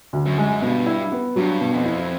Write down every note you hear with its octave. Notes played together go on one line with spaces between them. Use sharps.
D2
F#2
G#3
G2 B2
E4
B3
G2 F#3
B2
F2
E4